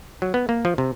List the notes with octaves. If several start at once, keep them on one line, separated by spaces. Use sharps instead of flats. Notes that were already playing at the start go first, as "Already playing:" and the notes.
F#3
B3
A#3
F3
C3